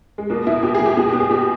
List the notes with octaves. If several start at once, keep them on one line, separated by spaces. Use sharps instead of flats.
G#3
B2 A#3
B2 E4
B2 G4
G#4
B2
G4
B2 G#4
B2 G4
G#4
B2 G4